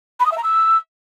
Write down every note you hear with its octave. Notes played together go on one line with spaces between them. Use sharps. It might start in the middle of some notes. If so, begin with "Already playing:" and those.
B5
D#6
E5
A#5
E6